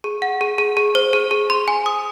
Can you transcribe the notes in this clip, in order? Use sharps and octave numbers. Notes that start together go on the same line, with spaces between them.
G#4
F#5
G#4
G#4
G#4
C5
G#4
G#4
C6
G#5
D#6